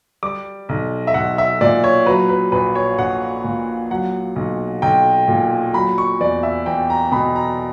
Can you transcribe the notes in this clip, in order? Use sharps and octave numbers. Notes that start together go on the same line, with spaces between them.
G3 D6
B1
E5
B1 F#5
E5
A#2 D5
C#5
F#3 B4
B4
A#1 B4
C#5
A#1 F#5
A#2
F#3 F#5
B1
B1 G5
A#2
F#3 B5
C#6
E2 D5
E5
E2 G5
A#5
B2 B5
A#5